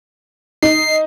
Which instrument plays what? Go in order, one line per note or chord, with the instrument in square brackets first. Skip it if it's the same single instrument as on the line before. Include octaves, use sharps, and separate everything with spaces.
[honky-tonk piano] D#4 [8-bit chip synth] C7